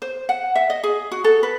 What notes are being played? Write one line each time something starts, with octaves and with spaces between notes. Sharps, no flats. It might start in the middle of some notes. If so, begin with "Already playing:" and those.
C5
F#5
E5
D#5
G#4
F#4
A4
B4